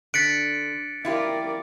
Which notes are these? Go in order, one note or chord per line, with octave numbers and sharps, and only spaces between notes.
D3 F#6 A6 B6 C#7 D7
E4 F4 G4 A#4 D5